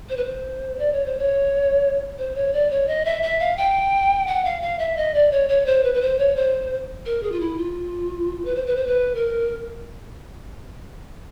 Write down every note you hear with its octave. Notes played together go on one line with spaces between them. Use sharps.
C5
B4
C5
D5
C#5
C5
C#5
C5
C#5
D5
C#5
D#5
E5
E5
F5
G5
F#5
F5
F5
E5
D#5
D5
C#5
C#5
C5
B4
B4
C5
C#5
C5
A#4
G#4
F4
E4
F4
B4
C5
B4
C5
B4
A#4